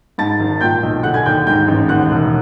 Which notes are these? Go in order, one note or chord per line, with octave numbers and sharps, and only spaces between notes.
G#2 A5 A6
G#1
A#2 G5 G6
B1
D3 F#5 F#6
G#5 G#6
D#2 G5 G6
G#2 G5 G6
A1
D#2 F#5 F#6
E1